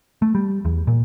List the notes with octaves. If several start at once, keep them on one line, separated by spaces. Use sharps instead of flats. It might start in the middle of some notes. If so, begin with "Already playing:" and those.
A3
G3
E2
A#2